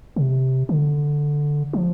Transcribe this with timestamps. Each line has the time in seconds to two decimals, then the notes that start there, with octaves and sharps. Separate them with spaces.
0.16 C3
0.69 D3
1.73 F3